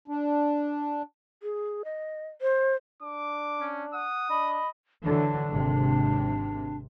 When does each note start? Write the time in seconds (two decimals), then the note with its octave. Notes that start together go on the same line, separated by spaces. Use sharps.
0.08 D4
1.43 G#4
1.85 D#5
2.41 C5
3.02 D4 D6
3.60 C#4
3.94 F#5 D#6
4.30 D4 D#5 B5
5.04 D3 E3 F#3 D4
5.51 G#1 C3